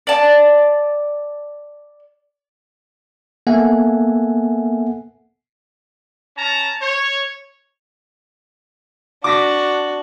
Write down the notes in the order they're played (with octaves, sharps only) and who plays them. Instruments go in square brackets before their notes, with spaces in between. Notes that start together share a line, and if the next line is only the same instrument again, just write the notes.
[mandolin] D5 A5
[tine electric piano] A#3 B3 A4 E5 F#5 G#5
[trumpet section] C#4 A5 A#5
C#5
[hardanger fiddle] D4 F#4 [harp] D6 A#6 B6